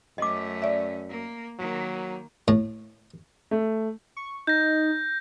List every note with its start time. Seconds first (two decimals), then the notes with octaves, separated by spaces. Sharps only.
0.18 F#2 A3 C#4 D#5 D6
0.62 D5 E5
1.09 A#3
1.59 D#3 F#3 A#3
2.48 A2
3.51 A3
4.17 C#6
4.47 D#4 G6 A#6